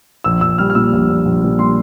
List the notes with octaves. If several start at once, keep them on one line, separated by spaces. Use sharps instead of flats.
A#1 E6
A#1 E6
G3 F6
F6
A#2 E6
A#1
A#1
A#1
A#2
G3 C6